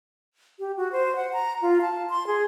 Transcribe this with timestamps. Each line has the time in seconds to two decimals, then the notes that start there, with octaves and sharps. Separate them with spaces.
0.59 G4
0.77 F#4
0.92 C5
1.16 F#5
1.33 A#5
1.62 F4
1.82 A5
2.10 C6
2.27 G#4